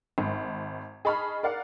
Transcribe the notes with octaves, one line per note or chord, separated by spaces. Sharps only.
G#1
G#4 D#5 A5 B5 C#6 F6
A#4 D5 F5 F#5